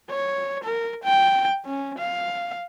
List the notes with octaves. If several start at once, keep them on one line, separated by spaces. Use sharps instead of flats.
C#5
A#4
G5
C#4
F5